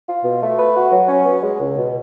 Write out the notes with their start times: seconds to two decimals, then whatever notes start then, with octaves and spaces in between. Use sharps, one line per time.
0.08 F4
0.25 B2
0.42 A3
0.58 B4
0.76 F#4
0.92 F#3
1.09 C#4
1.26 B3
1.43 G#3
1.60 C#2
1.77 B2